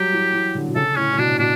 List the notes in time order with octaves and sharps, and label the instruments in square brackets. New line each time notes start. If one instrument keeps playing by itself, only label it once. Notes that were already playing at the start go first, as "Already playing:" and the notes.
Already playing: [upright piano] F#3 G3 [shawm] G4
[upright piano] E3
E3
D3
B2
[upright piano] C#3 [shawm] A4
[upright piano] A2 [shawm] C#4
[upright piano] A2
[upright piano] B2 [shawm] D4
[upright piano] B2 [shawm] D4